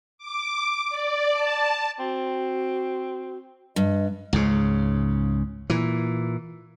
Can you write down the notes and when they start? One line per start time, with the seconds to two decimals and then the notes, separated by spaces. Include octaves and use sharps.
0.18 D6
0.89 D5
1.33 A5
1.99 C4 F#4
3.76 G2 D#5
4.33 C#2 G#2 C#3
5.70 A#2 E3